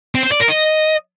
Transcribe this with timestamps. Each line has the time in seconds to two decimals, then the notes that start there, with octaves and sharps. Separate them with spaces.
0.15 C4
0.23 C5
0.31 D5
0.40 A#4
0.48 D#5